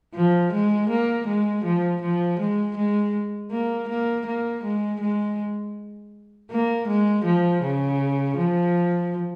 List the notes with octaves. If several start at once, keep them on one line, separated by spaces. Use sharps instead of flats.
F3
G#3
A#3
G#3
F3
F3
G#3
G#3
A#3
A#3
A#3
G#3
G#3
A#3
G#3
F3
C#3
F3